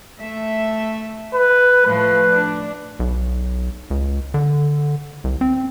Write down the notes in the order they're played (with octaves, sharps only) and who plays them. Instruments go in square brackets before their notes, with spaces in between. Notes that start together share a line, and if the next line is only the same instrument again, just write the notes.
[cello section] A3 E5
[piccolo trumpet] B4
[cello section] A2 F3 A3 [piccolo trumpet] B4
[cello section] D4
[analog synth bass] B1
C#2
D3
C2
C4